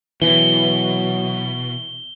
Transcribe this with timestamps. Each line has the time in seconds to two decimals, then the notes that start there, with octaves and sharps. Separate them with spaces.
0.22 B2 E3 F#3 G7